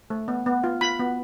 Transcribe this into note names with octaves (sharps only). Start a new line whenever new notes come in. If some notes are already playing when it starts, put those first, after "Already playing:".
A3
B3
B3
F4
F4 B5
B3